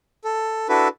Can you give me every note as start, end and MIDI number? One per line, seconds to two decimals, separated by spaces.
0.24 0.68 69
0.69 0.88 62
0.69 0.88 64
0.69 0.88 66
0.69 0.88 69
0.69 0.88 71